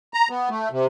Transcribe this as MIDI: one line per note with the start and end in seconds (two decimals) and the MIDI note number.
0.14 0.28 82
0.30 0.49 59
0.50 0.69 57
0.71 0.87 48